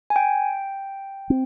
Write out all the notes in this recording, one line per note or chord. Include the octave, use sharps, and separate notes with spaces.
G#5
G5
C4